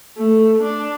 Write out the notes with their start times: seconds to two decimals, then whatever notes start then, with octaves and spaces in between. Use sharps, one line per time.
0.17 A3
0.63 D4